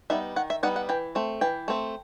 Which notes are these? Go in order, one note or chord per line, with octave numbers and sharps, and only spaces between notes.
G3 B3 D#4 E5
D#3 F#5
E5
G3 B3 D#4 F#5
F#5
E3 G5
A3 C4
E3 G5
A3 C4